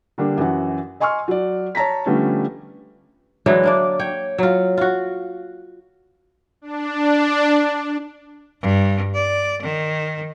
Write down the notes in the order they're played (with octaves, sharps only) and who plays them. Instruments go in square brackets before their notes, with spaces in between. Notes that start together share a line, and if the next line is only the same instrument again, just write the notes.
[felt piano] D3 G3 A#3 D4
F#2 E3 F#5
D#5 G#5 C6 C#6 F6
F#3 D5
C#5 A5 A#5 A#6 B6
D3 F3 G3 A3 B3 C#4
[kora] D3 E3 F#3 G#3
A#3 D4 D5
C#5 G5
F#3 F4
F4 F#4
[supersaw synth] D4
[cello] G2
D5
D#3